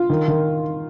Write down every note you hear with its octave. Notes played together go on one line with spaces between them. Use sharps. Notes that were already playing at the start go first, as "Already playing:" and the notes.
Already playing: F4
D#3
D#3